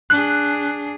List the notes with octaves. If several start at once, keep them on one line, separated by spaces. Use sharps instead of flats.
D4 G#4 F#6